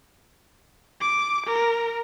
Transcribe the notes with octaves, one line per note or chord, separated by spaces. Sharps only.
D6
A#4